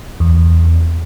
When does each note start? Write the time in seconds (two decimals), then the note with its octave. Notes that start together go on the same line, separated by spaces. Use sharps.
0.20 E2